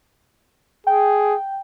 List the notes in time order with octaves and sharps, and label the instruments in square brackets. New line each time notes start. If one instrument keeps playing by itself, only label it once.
[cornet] G#4 [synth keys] G5